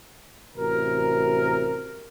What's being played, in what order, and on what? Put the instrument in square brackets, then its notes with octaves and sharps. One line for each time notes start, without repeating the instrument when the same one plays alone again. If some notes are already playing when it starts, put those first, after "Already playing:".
[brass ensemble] A1 C3 F#4 A#4